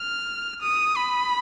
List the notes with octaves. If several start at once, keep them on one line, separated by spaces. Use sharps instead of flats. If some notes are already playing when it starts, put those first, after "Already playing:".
Already playing: F6
D#6
B5